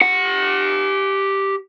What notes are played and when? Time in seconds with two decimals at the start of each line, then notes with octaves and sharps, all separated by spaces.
0.01 G4 F#5